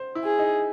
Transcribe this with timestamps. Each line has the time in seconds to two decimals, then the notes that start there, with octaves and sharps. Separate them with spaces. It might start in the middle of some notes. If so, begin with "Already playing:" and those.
Already playing: C5
0.15 E4
0.24 G#4
0.39 D#4